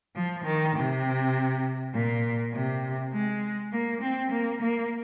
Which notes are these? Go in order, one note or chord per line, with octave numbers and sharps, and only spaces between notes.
F3
D#3
C3
A#2
C3
G#3
A#3
C4
A#3
A#3